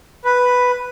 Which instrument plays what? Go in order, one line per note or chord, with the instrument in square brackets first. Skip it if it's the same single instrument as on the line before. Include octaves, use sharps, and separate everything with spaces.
[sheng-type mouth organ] B4